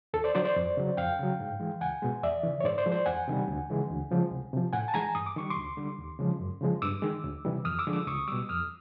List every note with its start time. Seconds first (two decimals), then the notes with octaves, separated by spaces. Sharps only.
0.14 D#2 A4
0.24 C5 D5
0.35 D3 F#3 C5 D5
0.45 C5 D5
0.56 F2
0.77 C#3 F#3
0.97 F2 F5 G5
1.19 C#3 F#3
1.40 G#2
1.60 E3 G#3
1.81 C#2 F#5 G#5
2.02 B2 G#3
2.23 E2 D5 E5
2.43 C#3 E3
2.60 C#5
2.64 G#2 C5 D5
2.78 C5 D5
2.86 F3 G#3
2.92 C5 D5
3.06 E2 F#5 G#5
3.28 C3 D#3 G3
3.48 D2
3.70 C#3 E3 G#3
3.90 D2
4.11 C#3 F3 G#3
4.31 C2
4.53 C3 F3
4.73 A2 F#5 G#5
4.88 A5
4.94 E3 G#3 G#5 A#5
5.15 G2 D#6
5.26 D6
5.36 D#3 G3 C#6
5.50 C6 D6
5.57 D2
5.77 D3 G3
5.98 D#2
6.19 C#3 F3 G#3
6.40 F#2
6.61 C#3 F3 G#3
6.82 G2 D6 E6
7.02 D#3 G#3
7.24 D2
7.45 C3 E3 G3
7.65 F2 D#6 F6
7.79 D6 E6
7.87 D3 F3 G#3
7.93 D6 E6
8.07 C#2 C#6 D#6
8.28 B2 G3 D6 E6
8.49 F2 D#6 F6